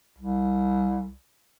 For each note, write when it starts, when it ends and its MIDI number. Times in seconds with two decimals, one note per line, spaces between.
0.19 1.13 36